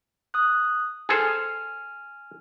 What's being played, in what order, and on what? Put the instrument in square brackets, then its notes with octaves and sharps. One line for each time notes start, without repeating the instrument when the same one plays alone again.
[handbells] D#6 F#6
[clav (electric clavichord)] G#4 A4 C5 [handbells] G#5 F6